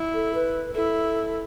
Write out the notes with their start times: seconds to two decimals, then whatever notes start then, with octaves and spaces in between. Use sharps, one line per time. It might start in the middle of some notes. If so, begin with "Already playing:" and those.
Already playing: E4
0.14 A4
0.35 B4
0.75 E4 A4